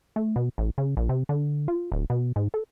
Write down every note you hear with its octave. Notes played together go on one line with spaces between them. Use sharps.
A3
B2
A1
C#3
A#1
C3
D3
F4
D1
B2
G#2
A4